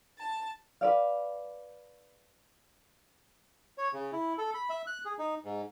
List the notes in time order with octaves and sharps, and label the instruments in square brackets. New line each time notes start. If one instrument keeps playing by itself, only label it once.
[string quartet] A5
[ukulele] B4 D5 F5
[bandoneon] C#5
C#3
E4
A4
B5
E5
F#6
G#4
D#4
G#2